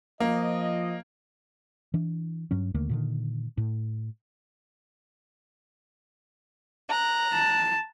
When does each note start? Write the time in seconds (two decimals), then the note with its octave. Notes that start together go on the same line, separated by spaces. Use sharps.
0.20 F3 A#3 D#5
1.94 E3 D4
2.51 G2 F#3 C#4
2.75 D#2 D3 A3 A#3
2.89 A#2 D3 D#3
3.58 A2
6.88 A#5 F#6
7.33 A5